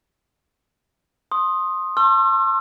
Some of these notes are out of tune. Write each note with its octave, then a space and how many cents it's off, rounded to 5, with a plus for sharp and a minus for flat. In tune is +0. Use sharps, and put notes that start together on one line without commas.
C6 +20 D#6 +0
A5 +20 C6 +40 E6 +40